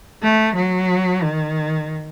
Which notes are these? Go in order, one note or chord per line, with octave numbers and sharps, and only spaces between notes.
A3
F#3
D#3